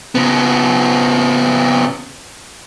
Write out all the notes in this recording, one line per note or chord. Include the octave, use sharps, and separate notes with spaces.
C#3 B3